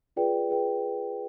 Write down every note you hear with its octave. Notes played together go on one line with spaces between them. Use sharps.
F4 G#4 B4 D5 G5
F4 G#4 B4 D5 G5